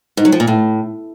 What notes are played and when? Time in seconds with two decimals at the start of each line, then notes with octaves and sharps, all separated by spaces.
0.17 G#2
0.25 F#3
0.32 F3
0.40 A#2
0.47 A2